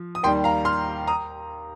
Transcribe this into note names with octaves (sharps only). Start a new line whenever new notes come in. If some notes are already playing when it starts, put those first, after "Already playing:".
Already playing: F3
D#6
D#2 D#3 G3 G5 C6
F5 A#5
C6 F6
A#5 D#6